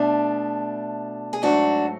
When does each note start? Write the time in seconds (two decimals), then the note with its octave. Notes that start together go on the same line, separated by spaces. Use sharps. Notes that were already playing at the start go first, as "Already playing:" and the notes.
Already playing: B2 A3 D4
1.33 G#4
1.42 G#2 F#3 A3 D4 F#4